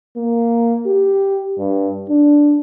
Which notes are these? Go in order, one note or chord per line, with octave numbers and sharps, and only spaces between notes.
A#3
G4
G2
D4